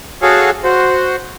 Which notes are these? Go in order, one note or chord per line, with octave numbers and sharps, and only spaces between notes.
F#4 G#4 A4 C#5 F5
F#4 C5